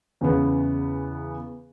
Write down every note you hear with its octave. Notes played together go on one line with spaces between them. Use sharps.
E2 C#3 B3